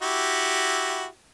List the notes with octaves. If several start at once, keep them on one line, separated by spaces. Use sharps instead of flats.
E4 F#4 G4